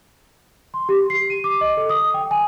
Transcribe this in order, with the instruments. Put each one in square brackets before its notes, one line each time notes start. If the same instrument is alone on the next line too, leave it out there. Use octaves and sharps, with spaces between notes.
[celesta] C6
G4
C7
D#7
D6
D#5
A4
D#6
G5
G#5